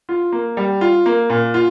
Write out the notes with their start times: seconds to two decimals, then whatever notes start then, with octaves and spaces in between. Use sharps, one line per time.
0.09 F4
0.32 A#3
0.57 G3
0.81 F4
1.06 A#3
1.30 A#2
1.54 F4